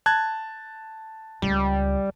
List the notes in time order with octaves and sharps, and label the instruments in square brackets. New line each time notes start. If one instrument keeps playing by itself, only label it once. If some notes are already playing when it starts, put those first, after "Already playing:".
[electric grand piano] A5 F#6 G#6
[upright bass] C#2 [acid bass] G3